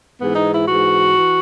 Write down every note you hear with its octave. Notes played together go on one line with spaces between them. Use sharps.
G#2 E3 B3
D#4
E4
G#2 E3 F#4
E3